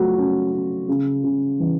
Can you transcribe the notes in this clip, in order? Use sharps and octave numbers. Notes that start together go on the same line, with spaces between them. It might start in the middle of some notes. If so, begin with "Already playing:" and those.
Already playing: F#3 A3 F4 F#4
C#4
C#4
C#3
C#3
E3